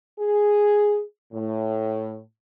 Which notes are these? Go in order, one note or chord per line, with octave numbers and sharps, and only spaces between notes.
G#4
A2